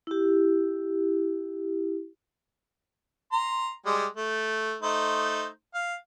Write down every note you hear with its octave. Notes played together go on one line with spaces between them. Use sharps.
E4 G4
A#5 C6
G3 G#3
A3
A3 D#4 C5
F5